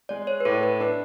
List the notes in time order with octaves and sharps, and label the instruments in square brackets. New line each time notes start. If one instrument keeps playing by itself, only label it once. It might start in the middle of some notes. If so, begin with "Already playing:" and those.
[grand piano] G#3 [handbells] D5
[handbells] C#5
B4
[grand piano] A2 [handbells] A4
[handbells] B4
[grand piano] D4 [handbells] B4